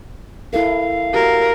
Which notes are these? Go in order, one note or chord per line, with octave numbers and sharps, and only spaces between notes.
E4 A4 A#4 F5
F#4 G4 A#4